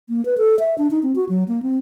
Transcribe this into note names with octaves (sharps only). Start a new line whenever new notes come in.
A#3
B4
A4
E5
D4
D#4
C4
F#4
F#3
A#3
C4